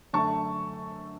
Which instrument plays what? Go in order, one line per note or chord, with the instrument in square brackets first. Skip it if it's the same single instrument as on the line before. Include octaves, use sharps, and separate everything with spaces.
[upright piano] F#2 D3 A3 D4 A5 C#6